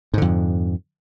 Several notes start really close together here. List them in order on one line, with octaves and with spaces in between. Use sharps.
G#2 D3 F2